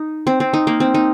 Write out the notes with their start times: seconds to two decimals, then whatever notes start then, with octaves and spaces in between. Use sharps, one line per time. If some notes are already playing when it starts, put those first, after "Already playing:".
Already playing: D#4
0.27 C4
0.40 C4
0.53 D#4
0.67 A#3
0.80 C4
0.94 D#4